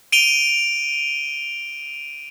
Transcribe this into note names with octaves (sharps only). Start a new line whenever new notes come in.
D7 D#7 F7 G7